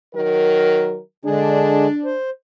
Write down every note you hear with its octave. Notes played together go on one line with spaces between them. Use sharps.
D#3 F#3 A#4
D3 G#3 D4 G#4
C5